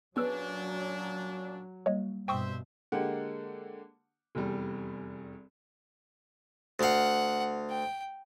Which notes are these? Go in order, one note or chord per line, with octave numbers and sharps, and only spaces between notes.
A#2 F#3 B3 C#4 D4 G#4 B4 E6
G3 A#3 C#5 D#5
G2 B2 C5 E5 G5 C#6 D#6
D3 G#3 A#3 G4 F#5
F1 E2 G3
D2 F5 F#5
G5